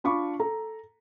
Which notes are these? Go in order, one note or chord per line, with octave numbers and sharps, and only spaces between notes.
D4 F4 B5 C#6 D6
A4 A#5